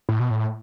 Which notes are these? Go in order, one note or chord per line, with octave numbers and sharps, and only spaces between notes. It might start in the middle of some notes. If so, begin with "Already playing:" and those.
A2
B2
A2